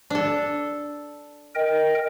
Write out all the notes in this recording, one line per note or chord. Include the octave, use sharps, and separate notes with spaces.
D4 A4
A#4 D#5 G5